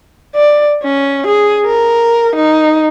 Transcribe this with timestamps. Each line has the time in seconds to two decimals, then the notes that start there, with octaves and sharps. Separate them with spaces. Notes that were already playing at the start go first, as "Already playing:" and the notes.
0.35 D5
0.84 C#4
1.27 G#4
1.66 A#4
2.36 D#4